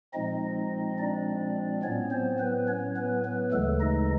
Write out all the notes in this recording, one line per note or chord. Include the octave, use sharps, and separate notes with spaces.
A#2 F3 G#3 C4 D#4 D#5
D4 D5
A2 F#3 B3 C#4 C#5
C4 C5
B3 B4
C#4 C#5
B3 B4
B3 B4
D2 C#3 E3 G#3 A3 A4
D#4 D#5